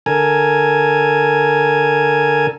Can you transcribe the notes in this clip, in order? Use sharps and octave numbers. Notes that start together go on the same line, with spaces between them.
D3 A4 A#4 G#5